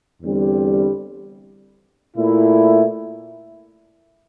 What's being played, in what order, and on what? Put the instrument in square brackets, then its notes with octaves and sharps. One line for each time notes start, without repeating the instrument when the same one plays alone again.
[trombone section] E2 D3 G3 C4
A#2 A3 E4